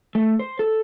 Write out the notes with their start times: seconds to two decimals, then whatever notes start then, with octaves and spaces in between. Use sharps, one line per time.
0.15 A3
0.39 C5
0.59 A4